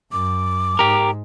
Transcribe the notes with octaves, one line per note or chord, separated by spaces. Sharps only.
F#2 D6
G#2 G4 A#4